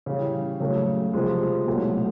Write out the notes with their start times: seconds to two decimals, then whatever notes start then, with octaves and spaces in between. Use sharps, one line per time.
0.06 C#3 E3 G3
0.60 C#3 F#3 A3
1.13 C3 F3 G#3
1.67 C2 B2 F#3 A3